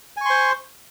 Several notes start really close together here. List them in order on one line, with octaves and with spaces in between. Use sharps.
G#5 C#6 C6 C5